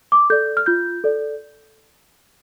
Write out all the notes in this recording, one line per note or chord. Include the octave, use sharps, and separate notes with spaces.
D6
A4 D5 G6
F6
F4 G6
A4 D5